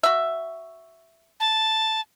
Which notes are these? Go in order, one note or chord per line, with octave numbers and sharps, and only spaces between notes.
F#4 E5
A5